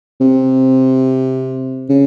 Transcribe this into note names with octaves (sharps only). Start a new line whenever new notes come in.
C3
C#3